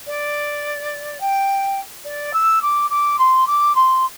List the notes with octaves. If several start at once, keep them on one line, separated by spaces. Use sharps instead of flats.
D5
G5
D5
E6
D6
D6
C6
D6
C6